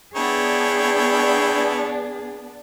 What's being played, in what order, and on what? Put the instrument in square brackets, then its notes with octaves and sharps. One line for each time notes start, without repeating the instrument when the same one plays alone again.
[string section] B3 D4 [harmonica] E4 C#5 G5 [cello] G#4